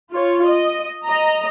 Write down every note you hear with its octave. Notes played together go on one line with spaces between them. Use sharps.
F4 C#5
D#5
D#5 A#5